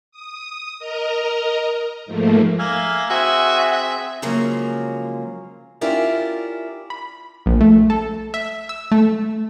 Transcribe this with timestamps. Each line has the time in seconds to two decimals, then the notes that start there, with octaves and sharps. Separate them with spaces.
0.12 D#6
0.79 A#4 D#5 A#5
2.06 G#2 F3 A3 A#3
2.59 A#3 E5 F5 G#5
3.10 C4 F#4 G#4 E5 G#5
3.71 E5
4.22 C#3 F3 F#3 G#3 A#3
5.81 C#4 E4 F4 G4 A#4 D5
6.90 B5
7.46 A#1
7.61 A3
7.90 A4
8.34 E5
8.69 E6
8.92 A3